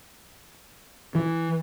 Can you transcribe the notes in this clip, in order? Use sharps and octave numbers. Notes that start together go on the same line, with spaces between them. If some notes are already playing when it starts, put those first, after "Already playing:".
E3